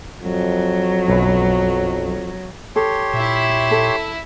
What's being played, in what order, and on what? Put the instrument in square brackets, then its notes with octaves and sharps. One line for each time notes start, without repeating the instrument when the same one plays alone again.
[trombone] F2 [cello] F#3
[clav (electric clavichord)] B1 F#2 B4
[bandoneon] G4 C#5 C6 [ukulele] A4
[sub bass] A#2 [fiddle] E4 E5
[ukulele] A4